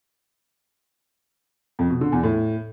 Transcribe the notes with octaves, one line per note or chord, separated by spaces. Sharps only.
F2
B2
D3
E2
A2